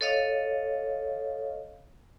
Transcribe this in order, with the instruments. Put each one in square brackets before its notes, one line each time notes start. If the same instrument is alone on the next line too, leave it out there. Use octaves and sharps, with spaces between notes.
[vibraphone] A4 C#5 D#5 F5